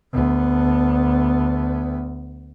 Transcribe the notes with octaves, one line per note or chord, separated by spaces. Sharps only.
D2 B3